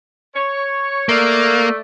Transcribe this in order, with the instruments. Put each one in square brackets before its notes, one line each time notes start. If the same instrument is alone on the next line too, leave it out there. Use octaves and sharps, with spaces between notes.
[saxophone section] C#5
[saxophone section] A3 D5 [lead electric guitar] A#3